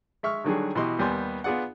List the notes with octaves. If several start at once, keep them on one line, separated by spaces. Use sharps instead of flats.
G#3 E5 C#6 F6
D3 D#3 F#3 G3 D4 G#4
B2 E3 G4 D#5 C6
D#2 G3 B3 G#5 C6
B3 F4 G#4 D5 F#5